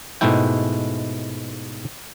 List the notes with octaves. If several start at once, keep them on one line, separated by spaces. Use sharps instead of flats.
G#2 B2 G#3 A3 E4 G5